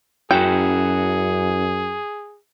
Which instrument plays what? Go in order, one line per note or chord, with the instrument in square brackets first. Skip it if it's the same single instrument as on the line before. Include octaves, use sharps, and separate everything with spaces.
[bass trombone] F#2 [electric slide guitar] C#4 E4 F#4 [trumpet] G#4 [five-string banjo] G5